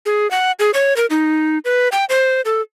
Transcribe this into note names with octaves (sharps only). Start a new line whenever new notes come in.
G#4
F#5
G#4
C#5
A#4
D#4
B4
G5
C5
A4